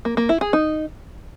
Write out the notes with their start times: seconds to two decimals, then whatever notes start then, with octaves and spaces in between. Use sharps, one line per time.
0.05 A#3
0.17 A#3
0.29 E4
0.41 G#4
0.53 D#4